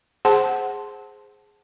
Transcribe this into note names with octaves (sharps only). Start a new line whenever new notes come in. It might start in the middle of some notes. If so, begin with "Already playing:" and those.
G#4 C5 F#5 A5 C6